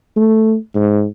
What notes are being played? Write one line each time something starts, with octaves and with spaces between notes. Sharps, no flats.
A3
G#2